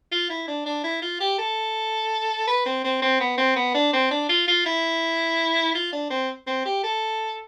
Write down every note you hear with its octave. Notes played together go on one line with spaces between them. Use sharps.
F4
E4
D4
D4
E4
F4
G4
A4
B4
C4
C4
C4
B3
C4
B3
D4
C4
D4
F4
F4
E4
F4
D4
C4
C4
G4
A4